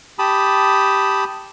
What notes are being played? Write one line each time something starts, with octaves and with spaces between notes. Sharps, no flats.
G4 A5 B5 D#6